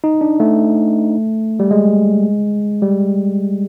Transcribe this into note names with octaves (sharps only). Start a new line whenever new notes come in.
D#4
D4
A3
G3
G#3
G3